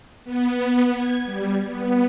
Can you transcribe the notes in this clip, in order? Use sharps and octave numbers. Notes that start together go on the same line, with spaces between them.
B3
G#6
G3
B3